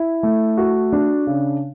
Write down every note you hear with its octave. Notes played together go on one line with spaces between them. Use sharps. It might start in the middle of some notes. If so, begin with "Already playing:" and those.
Already playing: E4
A3
F#4
D4
C#3